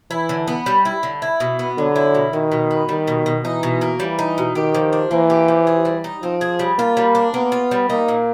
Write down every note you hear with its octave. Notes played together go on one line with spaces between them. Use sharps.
E3 E4
D3
B3
G3
E4
D3
E4
B2
B3
D3 F#3
E4
B2
B2 D#3
B2
B3
D#3 G3
B2
B2
E3 D#4
B2
A#3
E3 G3
D#4
B2
D#3 G4
F3
D4
E3 A#3
G4
F3
G#4
G3
D#4
F3 C4
G#4
G3
A#3 F4
G3
D4
A#3 B3
F4
G3
A#3 D#4
A#2